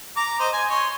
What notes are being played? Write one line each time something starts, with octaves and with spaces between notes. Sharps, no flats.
A#5 D6
C5 D#5
G#5
C#5 C6